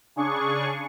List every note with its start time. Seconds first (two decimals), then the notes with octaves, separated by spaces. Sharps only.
0.16 C#3 D4 G#4 C#6